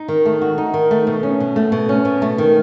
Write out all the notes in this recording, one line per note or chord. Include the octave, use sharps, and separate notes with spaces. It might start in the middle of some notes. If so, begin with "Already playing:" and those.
Already playing: D#4
D#3
A3
F#4
D#4
D#3
A3
B2
C#4
B2
A3
B2
C#4
B2
A3
D#3